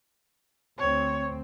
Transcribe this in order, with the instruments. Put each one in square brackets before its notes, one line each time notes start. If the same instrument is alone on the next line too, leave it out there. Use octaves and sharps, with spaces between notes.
[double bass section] D2 C4 [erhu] C#5